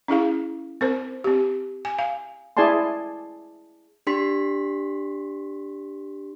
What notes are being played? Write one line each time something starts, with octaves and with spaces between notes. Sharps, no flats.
C#4 E4 G#4 F5
C4 A#4 C5
C4 G4
G#5
F5
E4 G#4 D5 G#5 A5 C6
D4 G4 C6 B6